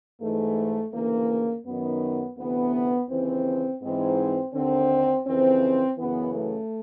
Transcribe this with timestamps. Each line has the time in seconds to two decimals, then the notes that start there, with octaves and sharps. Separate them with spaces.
0.21 G#2 E3 A3
0.93 D2 C#3 E3 A#3
1.66 F#2 D#3 B3
2.37 D2 C3 E3 B3
3.10 D#2 C#3 E3 C4
3.82 G#2 E3 C4
4.54 D#2 D3 C4
5.26 F2 C#3 E3 C4
5.98 F#2 C#3 E3 B3
6.34 A3